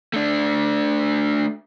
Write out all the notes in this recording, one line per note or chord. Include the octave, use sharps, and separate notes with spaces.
A3 D4